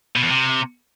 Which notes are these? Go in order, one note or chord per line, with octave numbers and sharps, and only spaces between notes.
B2
E2
C3